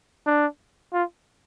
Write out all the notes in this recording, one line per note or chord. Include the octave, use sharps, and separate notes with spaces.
D4
F4